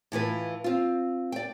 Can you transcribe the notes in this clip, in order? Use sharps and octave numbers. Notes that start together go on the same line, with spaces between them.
A2 E3 F4 B4
C4 F4
D5 G5